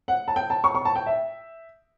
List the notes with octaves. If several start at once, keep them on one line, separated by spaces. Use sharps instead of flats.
F#5
A5
G5
A5
C#6
C#6
A5
G5
E5